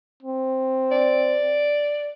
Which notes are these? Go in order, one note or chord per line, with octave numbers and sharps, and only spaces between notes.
C4
D5